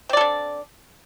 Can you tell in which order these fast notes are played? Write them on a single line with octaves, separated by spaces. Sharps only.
C4 D5 A4 D4